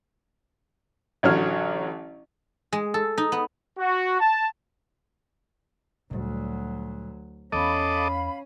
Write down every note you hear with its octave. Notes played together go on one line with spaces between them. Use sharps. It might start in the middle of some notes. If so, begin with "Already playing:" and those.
A1 D3 F#3 C#5 F6
G#3
A4
D#4
B3
F#4
A5
D2 A#2 F#3 G3
E2 C#4 A4 D#5 F5 B5 D6